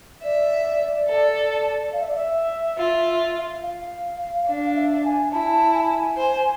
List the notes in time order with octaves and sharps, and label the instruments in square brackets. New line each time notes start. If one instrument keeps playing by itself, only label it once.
[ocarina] D5 [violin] E5
[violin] A4
[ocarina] F5
E5
D5
E5
[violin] F4
[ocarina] F5
[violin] D4 [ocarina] F5
[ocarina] E5
G#5
[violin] E4 [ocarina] A5
[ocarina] G#5
[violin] C5